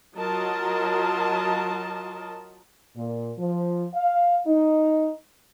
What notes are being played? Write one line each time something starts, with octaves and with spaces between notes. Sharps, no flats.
F#3 F4 F#4 A#4 D#5 A5
A#2
F3
F5
D#4